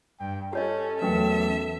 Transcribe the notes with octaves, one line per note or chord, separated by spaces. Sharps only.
G2 G5
C#4 G4 A4 C#5 D#5
E2 F#3 A3 C#4 A#4 B4 E5 G5